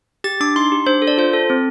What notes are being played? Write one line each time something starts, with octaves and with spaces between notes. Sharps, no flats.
G4 A6
D4 D6
D#4 C6
G4
D4 C5
A4
D5
F4 C5
A4
C4